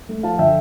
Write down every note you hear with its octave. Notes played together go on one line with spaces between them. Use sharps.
A3
F3 F5 A5
D3 E5 G5